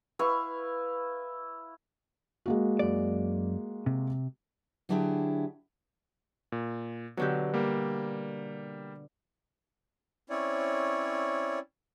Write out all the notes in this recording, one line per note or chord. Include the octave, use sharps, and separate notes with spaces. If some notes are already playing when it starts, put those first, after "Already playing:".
E4 B4 F5 C#6
G#3 A#3 F#4
F#2 D5
C3
D3 F#3 D4 E4 G4 G#4
A#2
B2 D3 F#3 G4
G3 A#3
C4 C#4 E4 C#5 D5